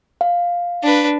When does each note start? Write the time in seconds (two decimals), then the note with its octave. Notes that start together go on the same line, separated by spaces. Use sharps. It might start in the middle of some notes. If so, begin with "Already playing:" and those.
0.21 F5
0.83 D4 B4